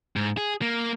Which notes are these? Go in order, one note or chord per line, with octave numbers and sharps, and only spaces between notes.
G#2
G#4
A#3